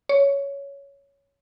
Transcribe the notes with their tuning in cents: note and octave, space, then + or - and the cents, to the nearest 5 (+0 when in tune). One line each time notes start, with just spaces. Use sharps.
C#5 +10